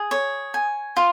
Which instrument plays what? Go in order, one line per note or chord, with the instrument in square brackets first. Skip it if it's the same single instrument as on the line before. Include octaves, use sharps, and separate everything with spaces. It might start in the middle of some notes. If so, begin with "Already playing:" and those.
Already playing: [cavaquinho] G#4
C#5
G#5
F4